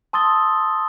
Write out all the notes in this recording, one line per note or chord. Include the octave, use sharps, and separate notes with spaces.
A5 C6 D#6 E6 A6 G7